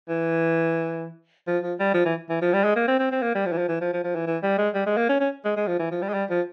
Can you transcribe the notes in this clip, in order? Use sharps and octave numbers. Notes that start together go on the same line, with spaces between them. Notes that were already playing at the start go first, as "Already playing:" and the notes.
E3
F3
F3
G3
F3
E3
E3
F3
G3
G#3
A#3
C4
C4
C4
A#3
G3
F3
E3
F3
E3
F3
F3
F3
E3
E3
G3
G#3
G3
G#3
A#3
C#4
C#4
G#3
G#3
F3
E3
F3
G3
G#3
G3
F3